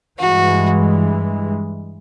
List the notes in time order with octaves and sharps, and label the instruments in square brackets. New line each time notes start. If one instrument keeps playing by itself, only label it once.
[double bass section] G2 E3 G#3 [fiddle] F#4